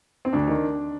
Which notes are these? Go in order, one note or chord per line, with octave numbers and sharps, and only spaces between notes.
C4
D2 D4
D#3